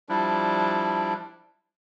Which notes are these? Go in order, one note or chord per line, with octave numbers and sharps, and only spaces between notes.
F3 G3 D4 E4